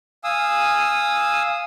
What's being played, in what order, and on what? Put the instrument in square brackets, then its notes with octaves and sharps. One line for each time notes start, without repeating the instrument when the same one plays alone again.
[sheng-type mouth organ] F5 G#5 D#6 E6